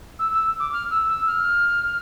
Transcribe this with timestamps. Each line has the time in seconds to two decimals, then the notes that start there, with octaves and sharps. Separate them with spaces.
0.19 E6
0.33 E6
0.59 D6
0.72 F6
0.90 E6
1.09 E6
1.26 F6